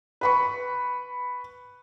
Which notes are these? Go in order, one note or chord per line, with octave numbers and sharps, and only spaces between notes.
B4 B5 C#6